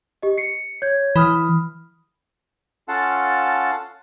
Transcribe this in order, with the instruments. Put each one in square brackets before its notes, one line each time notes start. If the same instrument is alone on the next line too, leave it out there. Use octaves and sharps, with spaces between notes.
[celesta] G4 D#5
C7 C#7
C#5 G6 G#6
[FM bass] E3 [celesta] B5 D#6 F6
[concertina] C#4 F4 A4 F5 F#5 A5